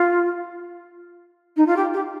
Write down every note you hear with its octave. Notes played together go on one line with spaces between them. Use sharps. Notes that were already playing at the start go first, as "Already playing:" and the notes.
Already playing: F4
D#4
F4
G4
G4